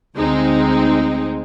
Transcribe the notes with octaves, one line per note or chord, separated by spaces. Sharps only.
D2 G#3 C4 D#4